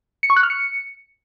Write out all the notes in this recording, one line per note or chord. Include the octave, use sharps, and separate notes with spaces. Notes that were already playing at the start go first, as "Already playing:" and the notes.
C#7
C#6
F#6
F6
C#7